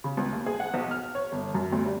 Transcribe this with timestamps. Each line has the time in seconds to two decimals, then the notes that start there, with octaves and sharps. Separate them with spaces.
0.04 C#3
0.17 C#2
0.33 D#2
0.46 G#4
0.60 F#5
0.74 B1
0.91 F6
1.15 C#5
1.32 G1
1.54 F#2
1.72 D2
1.85 G3